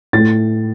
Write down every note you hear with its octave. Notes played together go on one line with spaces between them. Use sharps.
A2 A3 A6